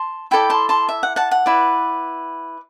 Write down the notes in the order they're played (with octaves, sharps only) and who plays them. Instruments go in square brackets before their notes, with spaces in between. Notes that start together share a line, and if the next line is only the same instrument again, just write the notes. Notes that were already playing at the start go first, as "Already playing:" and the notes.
Already playing: [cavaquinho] A5 C6
E4 A4 D5 G5 B5
A5 C6
A5 C6
E5
F#5
F#5 A5
F#5
E4 B4 D5